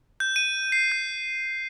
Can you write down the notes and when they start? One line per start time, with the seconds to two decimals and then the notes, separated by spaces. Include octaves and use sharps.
0.20 G6
0.36 D#7
0.72 C7
0.92 G6